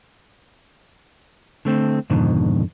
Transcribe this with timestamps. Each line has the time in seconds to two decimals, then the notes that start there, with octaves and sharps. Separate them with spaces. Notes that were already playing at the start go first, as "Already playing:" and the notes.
1.65 D3 A3 C4
2.10 F2 G#2 B2 D3 D#3